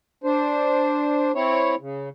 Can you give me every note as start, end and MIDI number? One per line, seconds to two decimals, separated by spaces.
0.24 1.32 62
0.24 1.32 72
1.35 1.75 60
1.35 1.75 64
1.35 1.75 73
1.80 2.09 49